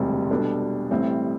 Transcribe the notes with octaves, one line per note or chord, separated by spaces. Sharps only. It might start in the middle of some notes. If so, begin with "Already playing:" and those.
Already playing: E1 D2 C3 G3 C4
B2 G3 D4 A4
A1 A2 G3 C4